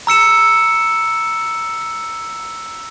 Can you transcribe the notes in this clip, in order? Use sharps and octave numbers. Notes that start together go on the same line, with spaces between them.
A#5 E6 C#7 E7